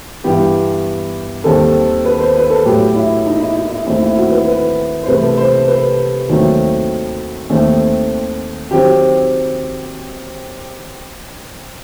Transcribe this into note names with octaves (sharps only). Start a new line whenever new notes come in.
G2 E3 B3 G4
D#2 D#3 G3 C4 A4
B4
C5
B4
A4
A2 F#3 B3 G4
E4
D#4
E4
E4
E4
D#2 D#3 A3 C4 E4
E4
F#4
B4
B4
C5
C2 C3 E3 A3 B4
A4
C5
B4
D#2 D#3 F#3 A3 C4
D#2 D#3 A3 C4
D#3 F#3 C4 G4